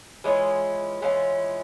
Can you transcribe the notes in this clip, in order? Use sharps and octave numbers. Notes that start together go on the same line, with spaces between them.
E3 G#3 C#4 F4 G#4
E3 G#3 C#4 F4